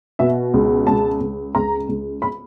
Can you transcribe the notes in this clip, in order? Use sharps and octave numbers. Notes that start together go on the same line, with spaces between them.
B2 E5
C#2
C#2 A5
C#2
C#2 A#5
C#2
B5